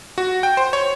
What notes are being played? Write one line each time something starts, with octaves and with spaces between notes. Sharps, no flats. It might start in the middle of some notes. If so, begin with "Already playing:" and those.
F#4
G5
C5
C#5